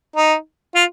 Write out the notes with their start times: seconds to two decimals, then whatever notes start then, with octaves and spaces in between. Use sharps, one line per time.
0.16 D#4
0.75 F4